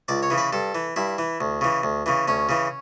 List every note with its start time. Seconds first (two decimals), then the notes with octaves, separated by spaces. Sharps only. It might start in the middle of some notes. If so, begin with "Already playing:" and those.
0.08 C#2 D5
0.23 C#5
0.30 C#3 E3
0.38 B4
0.53 G2 A4
0.75 E3
0.96 G2 E4
1.18 E3
1.41 D2
1.61 C#3 E3
1.83 D2
2.06 C#3 E3
2.28 D2 C#4
2.49 C#3 E3